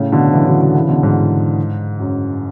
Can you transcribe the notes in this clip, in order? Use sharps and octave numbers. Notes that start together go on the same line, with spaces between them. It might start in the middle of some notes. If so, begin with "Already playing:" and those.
Already playing: A2 C#3
B2 D3
C#3 E3
D3 F#3
D3 F#3
C#3 E3
B2 D3
G#2
F#2